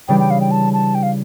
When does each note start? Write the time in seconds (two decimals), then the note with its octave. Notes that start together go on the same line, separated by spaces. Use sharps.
0.08 C#3 E3 G3 D4 G5
0.20 G5
0.31 F5
0.41 G5
0.51 A5
0.73 A5
0.95 G5
1.03 F5